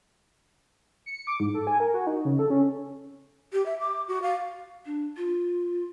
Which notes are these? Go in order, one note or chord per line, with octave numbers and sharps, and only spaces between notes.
C#7
D6
G#2
A4
G#5
A#4
F#4
D#4
C#3
A4
C#4
G4
E5
D6
F#4
F5
D4
F4